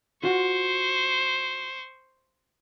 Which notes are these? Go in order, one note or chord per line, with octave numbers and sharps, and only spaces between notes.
F4 F#4 C5 F#5 C#6